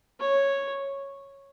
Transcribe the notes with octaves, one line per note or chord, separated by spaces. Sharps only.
C#5